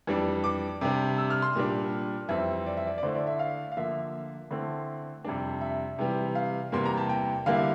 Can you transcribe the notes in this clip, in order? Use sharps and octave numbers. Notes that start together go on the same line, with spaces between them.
F2 E3 G3 D4
D6
C3 G3 D4
E6
F6
C6
A#2 G3 D4
F2 E3 G3 C4 E5
D5
E5
D5
D5
D3 A3 E4 C5
D5
E5
F5
F5
D3 F3 A#3 E5
D3 A3 C4 E4
F2 C3 G3 D4
E5
C3 E3 G3
F5
E2 C3 E3 G3 A#3 C6
A#5
A5
G5
D3 G3 A#3 E4 F5